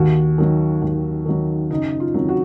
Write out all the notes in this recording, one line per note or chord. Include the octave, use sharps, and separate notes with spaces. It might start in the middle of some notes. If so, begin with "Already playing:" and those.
Already playing: D#2 F#4
D#3 F#3
D#2
D#3 F#3
F#1 D#4
F4
F2 D#3 F#3
F#4